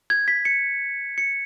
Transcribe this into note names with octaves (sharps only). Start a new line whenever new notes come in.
G#6
B6
C#7
C#7